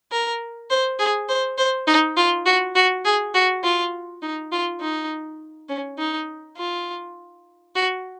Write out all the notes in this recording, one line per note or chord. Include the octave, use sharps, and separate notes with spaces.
A#4
C5
G#4
C5
C5
D#4
F4
F#4
F#4
G#4
F#4
F4
D#4
F4
D#4
C#4
D#4
F4
F#4